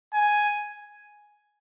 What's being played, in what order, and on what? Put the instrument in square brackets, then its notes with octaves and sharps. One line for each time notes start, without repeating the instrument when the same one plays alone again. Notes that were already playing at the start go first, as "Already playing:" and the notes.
[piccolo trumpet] G#5